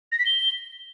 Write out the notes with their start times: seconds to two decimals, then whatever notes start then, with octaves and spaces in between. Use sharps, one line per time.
0.12 A#6
0.19 B6
0.26 G7